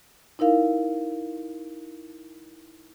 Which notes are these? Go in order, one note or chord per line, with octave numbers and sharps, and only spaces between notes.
D#4 E4 A#4 F5